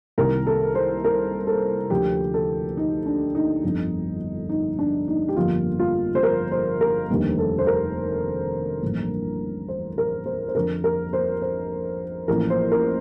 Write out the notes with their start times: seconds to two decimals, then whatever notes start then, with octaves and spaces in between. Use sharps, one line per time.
0.18 C2 C3 D#3 A#4
0.47 A4
0.75 C5
1.04 A#4
1.47 A4
1.90 D2 D3 F3 G4
2.34 A4
2.77 D#4
3.06 D4
3.35 D#4
3.64 G1 F2 D3 A3
4.49 D#4
4.79 D4
5.08 D#4
5.29 G4
5.36 G1 F2 D3 F3 A#3 F4
5.79 F4
6.15 C5
6.23 A#4
6.52 C5
6.81 A#4
7.09 F1 D#2 D3 G3 A#3
7.39 A4
7.58 C5
7.67 A#4
8.83 A1 G2 D3 F3 A#3
9.68 C5
9.98 A#4
10.26 C5
10.48 C5
10.55 F2 D3 A3 A#4
10.84 A#4
11.13 C5
11.42 C5
12.28 A1 A2 F3 A#3 A#4
12.50 C5
12.71 A#4